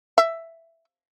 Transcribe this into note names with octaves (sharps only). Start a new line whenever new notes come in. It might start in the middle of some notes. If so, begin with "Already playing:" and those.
E5